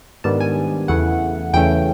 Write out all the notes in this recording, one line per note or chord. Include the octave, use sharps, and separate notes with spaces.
G#2 D#3 G3 B3 D4 A5
G#5
E2 C#3 E3 A3 F#5
E2 C#3 E3 A3 C#4 G5